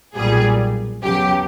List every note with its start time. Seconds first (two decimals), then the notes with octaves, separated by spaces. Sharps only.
0.16 B1 A#2 G3 G#4
1.03 E2 C#3 F#3 G4